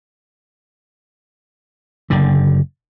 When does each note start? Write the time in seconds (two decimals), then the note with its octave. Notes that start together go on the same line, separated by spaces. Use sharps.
2.10 F#1 D3